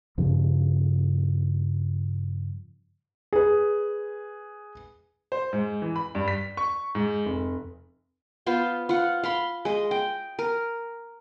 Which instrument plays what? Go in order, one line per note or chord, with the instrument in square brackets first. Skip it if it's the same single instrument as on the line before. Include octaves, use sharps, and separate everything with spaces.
[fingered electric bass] G2 C#3 F3 G3
[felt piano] G#4 B4
[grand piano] C5
G#2
E3
B5
G2
B6
C#6
G#2
F1
[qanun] B3 F4 C5
F4 F#5
F5 B5 C6
G#3 D#5
G5
A#4